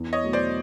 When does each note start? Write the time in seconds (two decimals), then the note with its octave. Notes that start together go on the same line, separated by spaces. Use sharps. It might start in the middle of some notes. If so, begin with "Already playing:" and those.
Already playing: E2
0.13 C#5 D#5
0.23 B2 F#3 A3
0.33 C5 D5